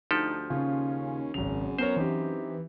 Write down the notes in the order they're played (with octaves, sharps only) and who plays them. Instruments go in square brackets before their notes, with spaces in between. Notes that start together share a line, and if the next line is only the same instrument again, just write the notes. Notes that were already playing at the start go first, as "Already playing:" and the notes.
[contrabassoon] D2 [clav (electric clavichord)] F3 G4 A4 [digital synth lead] D#4
[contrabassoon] D#2 [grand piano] C#3 F4 [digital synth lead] C#4
[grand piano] G#1 F7 [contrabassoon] F#2 [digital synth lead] C#3
[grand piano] B3 A#4 C#5 [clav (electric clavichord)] C5 [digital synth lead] A#5
[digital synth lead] E3 [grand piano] C4 D#4 G4